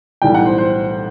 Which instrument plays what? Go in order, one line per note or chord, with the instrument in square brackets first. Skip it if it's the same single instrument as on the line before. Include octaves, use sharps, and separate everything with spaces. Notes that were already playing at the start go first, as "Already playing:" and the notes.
[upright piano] B1 A2 E3 G3 G5
F#5
C5
C5